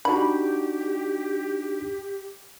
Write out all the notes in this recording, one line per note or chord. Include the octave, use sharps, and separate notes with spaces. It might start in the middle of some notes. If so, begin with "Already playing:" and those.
D4 D#4 F#4 G4 B5